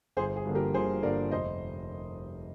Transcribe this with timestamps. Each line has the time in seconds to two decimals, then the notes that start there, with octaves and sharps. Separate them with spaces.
0.17 G1 G#4 C5
0.36 G#4
0.45 G2 D3 F3 A#3
0.55 G4 A#4
0.74 G1 G#4 C5
1.02 G2 D3 F3 A#3 A#4 D5
1.31 F1 C5 D#5